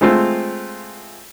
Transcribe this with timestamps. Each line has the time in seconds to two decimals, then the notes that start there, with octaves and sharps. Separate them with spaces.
0.01 G#3 A3 C4 F4